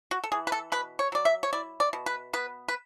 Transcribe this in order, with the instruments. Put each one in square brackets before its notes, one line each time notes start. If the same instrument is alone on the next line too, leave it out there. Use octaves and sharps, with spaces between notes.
[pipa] F#4
A4
E3 G#4
B4
A4
B2 B4
C#5
F#3 D5
E5
C#5
E4 D5
D5
B2
B4
B3 B4
B4